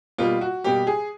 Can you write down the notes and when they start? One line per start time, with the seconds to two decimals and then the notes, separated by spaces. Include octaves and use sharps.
0.18 B2 G3 A#3 F4
0.41 F#4
0.64 B2 G3 A#3 G4
0.87 G#4